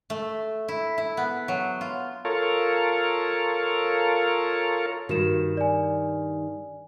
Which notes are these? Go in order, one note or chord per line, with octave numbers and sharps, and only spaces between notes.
A3
E4
E4
B3
F#3
F4
F4 A4 A#4 C#5
G2 D#3 F#4 E7
D5 G#5